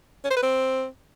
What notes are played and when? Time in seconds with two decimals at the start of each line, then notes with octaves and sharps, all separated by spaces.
0.24 C#4
0.30 C5
0.36 B4
0.42 C4